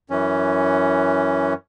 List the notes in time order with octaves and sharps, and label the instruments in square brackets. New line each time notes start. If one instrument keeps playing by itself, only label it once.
[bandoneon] F#2 E3 C#4